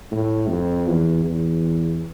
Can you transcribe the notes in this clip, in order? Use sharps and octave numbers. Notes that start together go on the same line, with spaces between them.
A2
F2
E2
E2